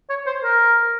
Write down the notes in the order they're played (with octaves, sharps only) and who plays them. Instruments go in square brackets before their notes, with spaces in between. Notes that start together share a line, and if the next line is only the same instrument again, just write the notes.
[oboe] C#5
C5
A#4